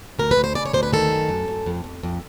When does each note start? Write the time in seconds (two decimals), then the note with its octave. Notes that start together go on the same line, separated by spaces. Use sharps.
0.19 D2 A#4
0.31 B4
0.37 D2
0.44 C5
0.55 C#3 D5
0.66 C#5
0.73 D2 C5
0.83 B4
0.93 D#3 A4
1.11 F#2
1.29 F#2
1.48 F#2
1.66 F2
1.84 F2
2.03 F2